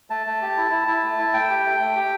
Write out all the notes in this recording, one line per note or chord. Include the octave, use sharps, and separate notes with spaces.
A3 A5
A3
G4
E4
E4
E4
A3
E4
A3 G5
G4
A3
A3
G4